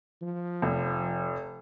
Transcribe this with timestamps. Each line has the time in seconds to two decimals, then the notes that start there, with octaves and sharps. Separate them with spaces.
0.22 F3
0.62 F1